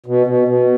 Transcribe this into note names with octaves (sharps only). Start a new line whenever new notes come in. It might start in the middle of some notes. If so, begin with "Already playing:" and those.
B2
B2
B2